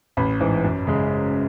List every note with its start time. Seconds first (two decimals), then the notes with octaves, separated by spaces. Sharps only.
0.17 A1 B5
0.40 G#2 E3
0.64 F#2
0.87 C#3 G#3